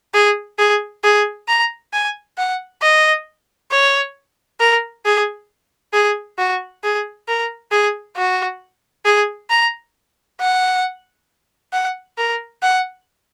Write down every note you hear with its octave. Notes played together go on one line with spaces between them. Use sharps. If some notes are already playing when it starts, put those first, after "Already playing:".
G#4
G#4
G#4
A#5
G#5
F#5
D#5
C#5
A#4
G#4
G#4
F#4
G#4
A#4
G#4
F#4
G#4
A#5
F#5
F#5
A#4
F#5